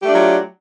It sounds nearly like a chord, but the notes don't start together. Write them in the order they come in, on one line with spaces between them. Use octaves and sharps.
G4 A3 D4 F4 F#3